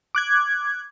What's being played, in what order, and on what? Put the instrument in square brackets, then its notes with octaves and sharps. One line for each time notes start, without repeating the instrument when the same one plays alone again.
[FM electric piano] D6 F#6 G#6